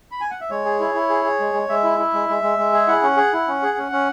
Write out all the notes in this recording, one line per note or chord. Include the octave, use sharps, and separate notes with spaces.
B5
G#5
F#5
E5
G#3 C#5
G#4
E4
E4
G#4
G#4
G#3
G#3
G#3 E5
E4
E4
G#3
G#3
G#3
G#3
G#4
E4 F#5
C#4
G#4
E4
C#4
G#4
C#4
C#4